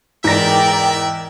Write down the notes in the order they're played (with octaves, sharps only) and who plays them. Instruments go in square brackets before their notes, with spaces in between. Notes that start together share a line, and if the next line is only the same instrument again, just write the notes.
[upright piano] E2 A#6 [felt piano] G#2 A#5 [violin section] A#4 D5 G5 [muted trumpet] E5